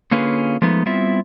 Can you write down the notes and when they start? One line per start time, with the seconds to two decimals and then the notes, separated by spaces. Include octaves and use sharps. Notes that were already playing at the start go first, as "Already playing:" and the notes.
0.11 D3 A#3 C#4 F4 G#4 B4
0.62 F3 G#3 A3 B3 D#4
0.86 G3 B3 C4 E4 F4 E5